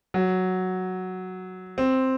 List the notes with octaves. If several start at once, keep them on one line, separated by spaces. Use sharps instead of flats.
F#3
C4